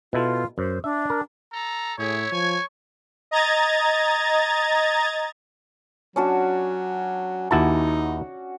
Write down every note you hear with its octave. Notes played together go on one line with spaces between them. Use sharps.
B2 E4 F4 A4
F#2 C5
D4 E5
A#4
A4 A#5
A2 E4 G#4 C#5
F3 G#5 C#6
D#5 A#5 G#6 A6
F#3 C#4 D4 F#4
D#2 D#4 E4 F#4 F#5 A5